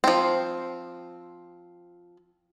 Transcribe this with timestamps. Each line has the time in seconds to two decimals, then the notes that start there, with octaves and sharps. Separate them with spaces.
0.04 F3 C4